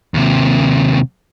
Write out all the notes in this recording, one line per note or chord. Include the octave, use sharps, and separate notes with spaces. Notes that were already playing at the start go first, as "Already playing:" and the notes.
D#2 C3